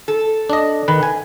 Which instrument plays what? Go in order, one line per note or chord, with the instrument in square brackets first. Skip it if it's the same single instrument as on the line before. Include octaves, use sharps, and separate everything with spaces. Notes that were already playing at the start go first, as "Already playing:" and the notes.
[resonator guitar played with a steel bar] A4
[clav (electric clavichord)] D4 D#5
D#3 B4
G#5